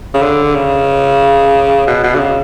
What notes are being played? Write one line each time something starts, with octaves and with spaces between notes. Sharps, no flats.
C#3
D3
C#3
B2
B2
D3
C#3